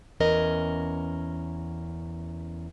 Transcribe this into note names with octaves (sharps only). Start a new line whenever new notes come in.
E2 C#4 A#4 D#5